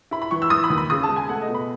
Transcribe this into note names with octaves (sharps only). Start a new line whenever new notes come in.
E4 B5
B5
E3 C#6
E6
E3 D#6
B5
D#2
B5
C#3 D#6
A5
G#3
G#5
A3 F#5
D#5
B2
B5